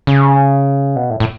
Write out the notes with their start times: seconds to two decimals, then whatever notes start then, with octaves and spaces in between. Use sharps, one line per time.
0.07 C#3
0.96 B2
1.10 A2
1.20 A2